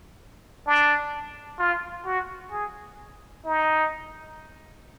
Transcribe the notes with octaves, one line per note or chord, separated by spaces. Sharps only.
D4
F4
F#4
G#4
D#4